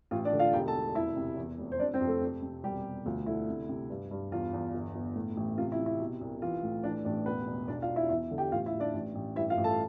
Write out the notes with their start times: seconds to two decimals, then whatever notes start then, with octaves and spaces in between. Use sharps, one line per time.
0.11 A1 F4
0.25 D4 D5
0.33 D3
0.39 F4 F5
0.53 E1 G4 G5
0.67 A4 A5
0.74 E1
0.95 F1 E4 E5
1.17 C3
1.37 E2
1.58 F1
1.72 C5
1.79 C3 D4 D5
1.94 C4 C5
2.01 F2
2.07 A3 A4
2.21 C3
2.42 C3
2.64 E1 G3 G4
2.85 E1
3.06 D2 F4
3.26 D3 E4
3.48 C3
3.69 C3
3.90 G2
4.11 G2
4.32 E2 F4
4.53 E2
4.74 G1
4.95 G1
5.16 A2
5.37 A1
5.58 C3 F4
5.72 E4
5.79 C3
5.86 E4
6.00 B2
6.21 C2
6.42 E3 F4
6.63 A2
6.83 E3 D4 D5
7.05 A1 D4 D5
7.26 E1 B3 B4
7.47 E1
7.68 B1 D4 D5
7.82 F4 F5
7.88 B2
7.96 E4 E5
8.09 E2 E4 E5
8.31 D3
8.38 G4 G5
8.52 A1 F4 F5
8.66 E4 E5
8.73 A1
8.80 D4 D5
8.94 A1
9.15 A1
9.36 G2 E4 E5
9.50 F4 F5
9.57 A1
9.64 A4 A5